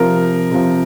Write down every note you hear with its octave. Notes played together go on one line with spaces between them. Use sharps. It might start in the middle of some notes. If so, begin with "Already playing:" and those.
Already playing: C3 F3 A#4
C3 F3